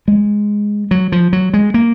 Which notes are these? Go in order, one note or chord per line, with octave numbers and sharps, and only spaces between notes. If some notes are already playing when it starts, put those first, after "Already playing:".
G#3
F#3
F3
F#3
G#3
A#3